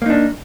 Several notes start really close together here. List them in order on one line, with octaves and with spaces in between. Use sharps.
A#3 D#4 D4